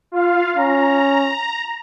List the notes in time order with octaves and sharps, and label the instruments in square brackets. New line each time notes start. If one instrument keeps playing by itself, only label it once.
[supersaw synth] F4 F5
[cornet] C#4 [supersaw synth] A#5